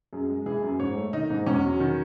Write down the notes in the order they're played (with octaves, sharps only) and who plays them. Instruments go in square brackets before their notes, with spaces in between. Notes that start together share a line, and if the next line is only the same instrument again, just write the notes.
[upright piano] F#2 G#4
G#3
E3 G#4
F#2
G#2 C#5
A3
D#3 D#4
G#2
E2 C#4
F#3
D#3